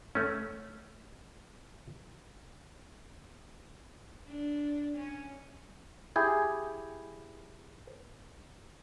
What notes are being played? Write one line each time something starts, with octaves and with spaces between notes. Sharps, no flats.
A3 C#4
D4
C#4
E4 G4 G#4